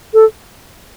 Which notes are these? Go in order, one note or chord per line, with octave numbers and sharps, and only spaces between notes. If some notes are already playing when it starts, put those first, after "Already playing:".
A4